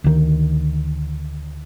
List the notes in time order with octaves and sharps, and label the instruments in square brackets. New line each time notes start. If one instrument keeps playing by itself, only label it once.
[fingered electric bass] D2 D#3